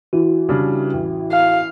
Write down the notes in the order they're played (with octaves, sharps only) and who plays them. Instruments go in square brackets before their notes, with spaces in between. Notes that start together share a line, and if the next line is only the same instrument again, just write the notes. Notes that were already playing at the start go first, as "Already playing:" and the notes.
[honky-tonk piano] E3 [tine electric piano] F#4
[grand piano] C#3 G3 D4
A1
[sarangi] F5